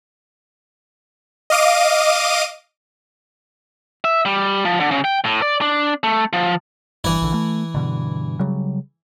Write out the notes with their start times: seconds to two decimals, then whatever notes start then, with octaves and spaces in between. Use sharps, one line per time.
1.50 D#5 F5 D6 D#7
4.04 E5
4.25 G3
4.65 F3
4.80 D3
4.91 C#3
5.04 G5
5.25 A2
5.42 D5
5.61 D4
6.03 A3
6.33 F3
7.04 G1 G2 E3 E4
7.21 A#1 D3
7.34 A3
7.75 G2 B2 D3
8.40 C#3 F#3 G3